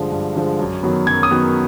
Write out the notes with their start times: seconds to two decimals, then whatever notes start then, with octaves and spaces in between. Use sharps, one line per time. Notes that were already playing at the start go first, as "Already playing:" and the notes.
Already playing: G2 D3 F3 G#3
0.12 G2
0.36 D3 F3 G#3
0.59 F#2
0.83 D#3 F#3 B3
1.07 F#2 G#6
1.23 D#6
1.31 D#3 F#3 B3